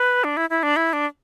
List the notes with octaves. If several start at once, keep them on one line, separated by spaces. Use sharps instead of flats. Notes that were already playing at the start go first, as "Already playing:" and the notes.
Already playing: B4
D4
E4
E4
D4
E4
D4